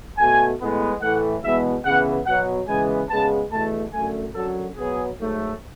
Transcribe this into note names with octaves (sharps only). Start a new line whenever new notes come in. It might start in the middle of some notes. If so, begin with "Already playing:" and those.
B2 A3 G#5
A2 G#3 B3
A2 E3 A3 F#5
E2 B2 G#3 B3 E5
C#3 E3 B3 F#5
B2 F#3 B3 F#5
C#3 E3 G#3 B3 G#5
C#3 G#3 B3 A5
E2 B2 A3 A5
F#2 D3 A3 G#5
F#2 D3 F#3 A4
B2 F#3 B3 G#4
G#2 F#3 A3